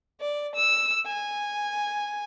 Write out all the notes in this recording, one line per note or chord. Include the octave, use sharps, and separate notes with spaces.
D5
E6
G#5